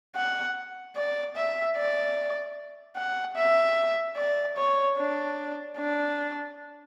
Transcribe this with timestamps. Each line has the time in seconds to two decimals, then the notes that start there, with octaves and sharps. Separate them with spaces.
0.16 F#5
0.96 D5
1.36 E5
1.76 D5
2.96 F#5
3.36 E5
4.17 D5
4.57 C#5
4.97 D4
5.78 D4